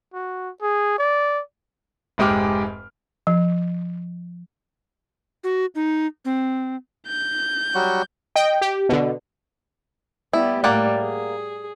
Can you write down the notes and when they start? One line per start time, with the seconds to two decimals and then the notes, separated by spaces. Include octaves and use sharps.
0.14 F#4
0.62 G#4
0.99 D5
2.18 F1 G#2 G#3 G4 D6 F6
3.27 F3
5.44 F#4
5.75 D#4
6.25 C4
7.07 G6
7.75 F#3 G3 F#4
8.36 D#5 G5
8.61 G4
8.89 B2 D3
10.33 G3 B3 E4 G4
10.64 A2 G3 A#3 D5 F#5
11.01 G#4